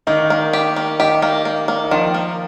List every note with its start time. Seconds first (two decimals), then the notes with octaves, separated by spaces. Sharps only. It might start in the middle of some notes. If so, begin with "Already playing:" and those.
0.07 D#3 A#3 D#4
0.30 A#3
0.53 G4
0.76 A#3
0.99 D#3 D#4 G4
1.22 A#3
1.45 A#3
1.68 A#3
1.84 D#4
1.91 D#3 F3 F4
2.14 A#3